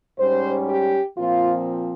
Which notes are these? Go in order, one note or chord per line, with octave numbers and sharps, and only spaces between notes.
G#2 G3 C#4 C5
G4
A#2 F3 C4 F4